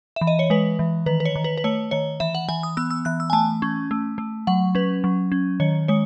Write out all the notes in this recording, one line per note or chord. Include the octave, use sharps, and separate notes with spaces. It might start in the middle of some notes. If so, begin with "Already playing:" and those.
E5
E3
D#5
C#5
G#3 B4
E3
D#3 B4
B4
C#5
D#3
B4
B4
A3 C#5
D#3 C#5
E3 E5
F#5
E3 G#5
D#6
B3 E6
E6
E3 F#6
E6
G#5
A3 A5
C#4
A3
A3
F#3 F#5
C#4 B4
F#3
C#4
D#3 C#5
G#3 C#5